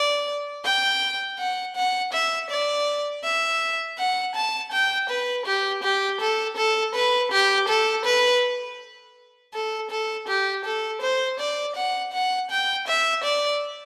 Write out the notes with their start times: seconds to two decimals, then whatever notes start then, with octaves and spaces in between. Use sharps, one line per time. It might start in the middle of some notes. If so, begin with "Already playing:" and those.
Already playing: D5
0.65 G5
1.39 F#5
1.76 F#5
2.12 E5
2.50 D5
3.24 E5
3.98 F#5
4.35 A5
4.72 G5
5.09 B4
5.46 G4
5.83 G4
6.21 A4
6.57 A4
6.95 B4
7.32 G4
7.68 A4
8.05 B4
9.54 A4
9.90 A4
10.28 G4
10.64 A4
11.02 C5
11.39 D5
11.76 F#5
12.13 F#5
12.50 G5
12.87 E5
13.24 D5